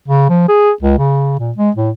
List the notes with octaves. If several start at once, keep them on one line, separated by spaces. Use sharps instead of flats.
C#3
F3
G#4
C#2
C#3
A#2
G#3
A2